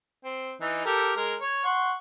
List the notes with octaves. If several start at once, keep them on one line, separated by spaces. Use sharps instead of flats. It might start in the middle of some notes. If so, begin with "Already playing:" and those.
C4
E3 D#4
G4 A4 A#4
G#3 A#4
C#5
F#5 C6 C#6